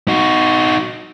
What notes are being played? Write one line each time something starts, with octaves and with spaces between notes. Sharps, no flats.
D#4 F#4